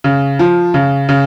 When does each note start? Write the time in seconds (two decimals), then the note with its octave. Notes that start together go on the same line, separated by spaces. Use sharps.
0.04 C#3
0.39 F3
0.74 C#3
1.09 C#3